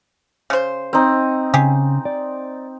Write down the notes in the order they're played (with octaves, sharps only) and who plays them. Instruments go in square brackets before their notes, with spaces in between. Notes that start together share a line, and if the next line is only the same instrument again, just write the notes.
[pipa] C#3 C5
[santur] C4 D#4
[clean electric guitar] C#3 [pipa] G4 G#4
[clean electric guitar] D5